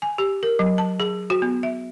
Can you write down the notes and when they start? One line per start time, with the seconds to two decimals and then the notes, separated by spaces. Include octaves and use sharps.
0.02 G#5
0.18 G4
0.43 A#4
0.59 F#3
0.78 A5
1.00 G#4
1.30 F#4
1.42 B3
1.63 E5